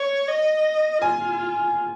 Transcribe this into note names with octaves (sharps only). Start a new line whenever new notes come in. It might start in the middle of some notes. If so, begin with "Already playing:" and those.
Already playing: C#5
D#5
F4 G#5